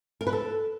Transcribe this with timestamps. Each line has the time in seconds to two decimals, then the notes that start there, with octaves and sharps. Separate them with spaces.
0.21 A#4
0.27 B4
0.33 A4